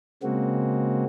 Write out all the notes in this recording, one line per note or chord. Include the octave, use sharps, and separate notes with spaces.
C#3 G#3 A#3 C4 F#4